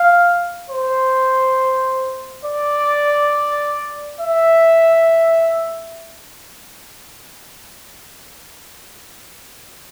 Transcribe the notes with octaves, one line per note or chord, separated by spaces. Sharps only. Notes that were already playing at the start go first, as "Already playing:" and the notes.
Already playing: F5
C5
D5
E5